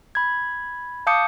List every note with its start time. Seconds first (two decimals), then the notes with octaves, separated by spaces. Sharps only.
0.15 B5 G#6
1.07 F5 A5 D6 D#6 G6 C#7